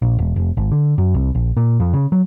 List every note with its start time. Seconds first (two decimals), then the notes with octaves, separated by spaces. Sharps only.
0.02 A#1
0.18 E1
0.36 F1
0.57 G#1
0.72 D3
0.98 F#2
1.14 C2
1.35 A#1
1.57 A#2
1.80 F2
1.94 C#3
2.12 F#3